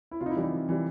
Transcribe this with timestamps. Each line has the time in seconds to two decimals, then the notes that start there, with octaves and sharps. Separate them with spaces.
0.11 E4
0.21 C3 F4
0.26 D#4
0.30 E4
0.37 E3 G3 D#4
0.52 C3
0.69 E3 G3